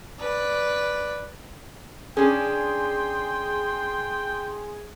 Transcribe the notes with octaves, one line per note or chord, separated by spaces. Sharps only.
B4 D5
C#4 D4 G#4 G5 C6